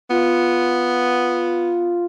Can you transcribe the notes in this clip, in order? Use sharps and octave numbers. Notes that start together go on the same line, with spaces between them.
B3 F4